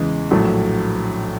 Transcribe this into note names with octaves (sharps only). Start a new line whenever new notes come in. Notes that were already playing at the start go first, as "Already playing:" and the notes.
Already playing: E2 C#3 E3 G#3
A#1 A2 F#3 A3